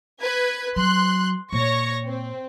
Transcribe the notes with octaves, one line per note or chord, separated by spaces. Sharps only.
B4 G#6 B6
F#3 C6 F#6
A#2 C#5 C#6 A#6
C4